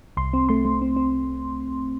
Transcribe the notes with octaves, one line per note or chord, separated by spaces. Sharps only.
C2 C6
C4
A3 C6
A3
C4
C4